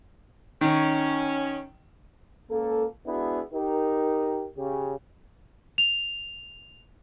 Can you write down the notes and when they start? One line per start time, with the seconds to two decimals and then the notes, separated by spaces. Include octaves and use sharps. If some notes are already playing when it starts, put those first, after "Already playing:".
0.61 D#3 C#4
2.50 C#2 A#3 A4
3.06 G#3 B3 D4 E4 F#4 G#4
3.54 D#4 G4 A#4
4.58 C#3 G4
5.78 F7